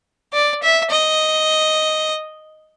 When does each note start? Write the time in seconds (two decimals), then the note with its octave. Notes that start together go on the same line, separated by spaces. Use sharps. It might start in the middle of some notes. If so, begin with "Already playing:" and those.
0.33 D5
0.62 E5
0.90 D#5